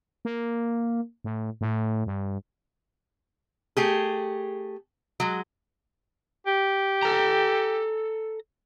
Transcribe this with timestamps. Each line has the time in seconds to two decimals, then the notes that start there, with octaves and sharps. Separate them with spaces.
0.25 A#3
1.24 A2
1.61 A2
2.06 G2
3.77 A3 G4 G#4
5.20 F#3 G#3
6.47 G4
7.03 A4 A#5